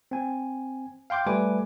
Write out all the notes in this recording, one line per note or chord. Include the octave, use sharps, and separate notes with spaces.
C4 G#5
F5 G5 C6 D6 G6
G3 A3 B4 G#5 D6